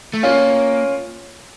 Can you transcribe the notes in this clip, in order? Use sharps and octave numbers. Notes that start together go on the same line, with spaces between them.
A3
A#3 C#4 F4